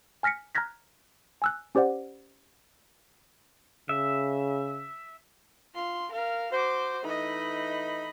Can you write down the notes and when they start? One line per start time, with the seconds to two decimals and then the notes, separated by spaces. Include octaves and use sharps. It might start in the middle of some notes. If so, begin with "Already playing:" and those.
0.23 G#5 F6 A#6 B6 C#7
0.55 A#5 F6 F#6 G#6 A#6 B6
1.42 G#5 E6 F#6
1.75 C#4 G4 C5 D5 F#5
3.89 C#3 E5
5.75 F4 C6
6.11 A#4 F5
6.52 F#4 C5 D6
7.04 E3 A3 D#4 D#5 B5